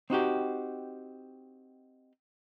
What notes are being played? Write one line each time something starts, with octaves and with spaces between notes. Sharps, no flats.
C4 D#4 F#4 G4